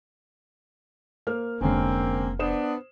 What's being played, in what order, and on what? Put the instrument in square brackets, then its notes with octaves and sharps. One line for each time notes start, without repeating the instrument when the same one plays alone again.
[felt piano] A#3 C5 F6
[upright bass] F1 [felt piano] D3 G#3 C#4 [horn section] A#3 C4
[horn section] B3 D4 [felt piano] C5 D#6 E7